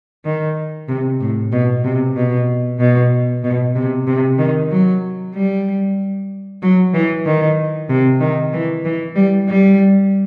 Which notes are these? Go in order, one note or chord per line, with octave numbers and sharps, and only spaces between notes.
D#3
C3
A2
B2
C3
B2
B2
B2
C3
C3
D#3
F#3
G3
F#3
E3
D#3
C3
D#3
E3
E3
G3
G3